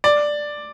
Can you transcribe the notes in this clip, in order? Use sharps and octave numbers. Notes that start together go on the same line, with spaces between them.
D5